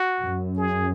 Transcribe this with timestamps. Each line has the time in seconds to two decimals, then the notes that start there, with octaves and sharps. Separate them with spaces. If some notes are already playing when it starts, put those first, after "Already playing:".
Already playing: F#4
0.21 F#2
0.57 G#4